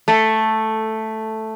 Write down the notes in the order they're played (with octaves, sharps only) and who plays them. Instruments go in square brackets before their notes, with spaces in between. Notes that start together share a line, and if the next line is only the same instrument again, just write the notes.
[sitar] A3